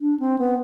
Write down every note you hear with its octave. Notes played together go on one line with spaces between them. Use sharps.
D4
C4
B3